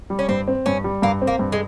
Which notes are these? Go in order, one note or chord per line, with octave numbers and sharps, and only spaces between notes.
G3
C#4
G2 C4
C4
G2 C#4
G3
G2 A#3
C4
A#3
G2
G#3